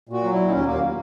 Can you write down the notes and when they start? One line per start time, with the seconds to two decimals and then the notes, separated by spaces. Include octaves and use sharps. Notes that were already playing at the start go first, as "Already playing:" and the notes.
0.09 A#2 F#4
0.24 F#3
0.33 A#2 E4
0.48 D#4
0.51 D#2 C#4
0.66 D#2 A#3